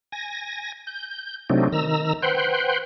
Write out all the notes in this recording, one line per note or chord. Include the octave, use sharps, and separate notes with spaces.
G#5 A#6
G6
C3 F#3 A3 C4 D4 D#4
D#3 A#5 E6
B4 C5 F#5 G5 C6